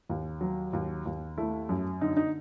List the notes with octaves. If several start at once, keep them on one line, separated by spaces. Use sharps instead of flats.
D#2
F#3
D#2
D#2
A3 E4
F#2
D3 D#4
D#4